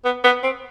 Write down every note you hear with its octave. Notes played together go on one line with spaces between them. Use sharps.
B3
B3
C4